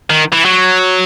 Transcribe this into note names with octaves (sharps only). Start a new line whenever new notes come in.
D#3
E3
F#3